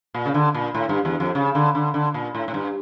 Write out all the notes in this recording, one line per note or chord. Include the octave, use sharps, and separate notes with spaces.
A#2
C#3
D3
A#2
A2
G2
E2
F2
C#3
D3
D3
D3
A#2
A2
A2
G2